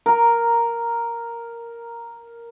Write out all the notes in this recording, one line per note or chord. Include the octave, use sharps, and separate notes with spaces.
A#4 A#5